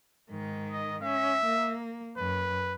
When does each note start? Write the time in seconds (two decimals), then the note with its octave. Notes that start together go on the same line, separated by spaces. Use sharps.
0.30 G#2 D#3
0.71 D#5
1.03 C#4 E5
1.45 A#3
2.17 F#2 B4